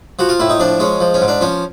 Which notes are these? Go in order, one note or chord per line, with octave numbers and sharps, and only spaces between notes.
F3 F#4
F4
A2 E4
D#4
F3 D4
G#3 C#4
F3
C#4
G#2
D4
F3 C#4